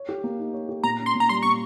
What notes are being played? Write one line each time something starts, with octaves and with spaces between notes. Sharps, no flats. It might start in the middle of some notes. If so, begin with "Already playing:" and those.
Already playing: C#5
G4
A#3
D#4
C#5
G4
A#2 A#5
C#4
C6
A#2
A#5
G3 C6
A#2 C#6